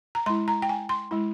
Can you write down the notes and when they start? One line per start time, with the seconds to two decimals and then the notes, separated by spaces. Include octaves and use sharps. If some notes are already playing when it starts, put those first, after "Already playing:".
0.15 A#5
0.26 G#3 C6
0.30 E4
0.48 A#5
0.62 G5
0.69 G#5
0.89 C6
1.11 G#3 E4